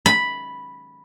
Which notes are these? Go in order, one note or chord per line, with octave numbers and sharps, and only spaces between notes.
B5